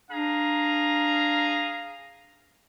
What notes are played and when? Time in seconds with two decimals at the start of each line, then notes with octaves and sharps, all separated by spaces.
0.11 D4 G#4 F5 A#5